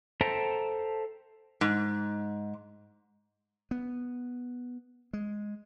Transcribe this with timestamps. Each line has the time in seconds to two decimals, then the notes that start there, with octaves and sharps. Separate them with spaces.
0.21 A4 C5 E5 G5 A5 A#5
1.61 G#2
3.71 B3
5.13 G#3